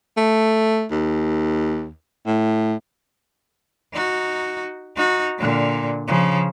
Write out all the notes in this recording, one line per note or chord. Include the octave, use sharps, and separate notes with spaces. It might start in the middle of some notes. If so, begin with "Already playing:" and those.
A3
D#2
A2
D#4 F#4
D#4 F#4
A#2 D3
C#3 F3